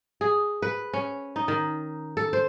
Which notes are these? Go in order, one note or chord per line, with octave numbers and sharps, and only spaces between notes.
G#4
B4
C#4
D#4
D#3
A4
C5